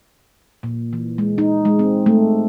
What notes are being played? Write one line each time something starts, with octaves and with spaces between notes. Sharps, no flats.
A#2
E3
G#3
D#4
G#3
C4
A3